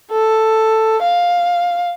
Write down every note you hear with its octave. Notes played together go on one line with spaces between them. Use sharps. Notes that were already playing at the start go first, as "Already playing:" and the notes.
A4
F5